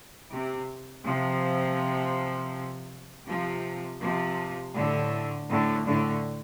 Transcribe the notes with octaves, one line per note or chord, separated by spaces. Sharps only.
C3
C3 F3
C3 F3
C3 F3
A2 D3
A2 D3
A2 D3